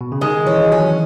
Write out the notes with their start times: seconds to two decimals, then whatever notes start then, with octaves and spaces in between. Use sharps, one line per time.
0.01 B2
0.12 C#3
0.21 D#3 G#3
0.46 E3 C#4
0.71 F#3 C#4